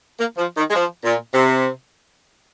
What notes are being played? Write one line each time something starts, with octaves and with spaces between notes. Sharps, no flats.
A#3
F3
D#3
G#3
F3
A#2
C3